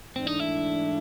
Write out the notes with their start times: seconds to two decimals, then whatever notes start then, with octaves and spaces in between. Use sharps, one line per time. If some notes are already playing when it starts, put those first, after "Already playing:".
0.16 G#2 E3 A3 C4 D4
0.27 D#4
0.39 E4